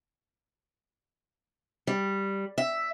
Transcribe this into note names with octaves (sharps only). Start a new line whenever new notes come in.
G3
E5